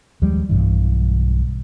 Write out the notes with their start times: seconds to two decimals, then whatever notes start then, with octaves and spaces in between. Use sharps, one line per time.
0.22 D#2 F3 G3 G#3
0.49 B1 G2 E3